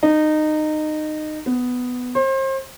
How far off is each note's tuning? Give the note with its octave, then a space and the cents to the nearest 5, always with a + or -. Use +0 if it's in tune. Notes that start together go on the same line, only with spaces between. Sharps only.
D#4 -20
B3 +10
C5 +35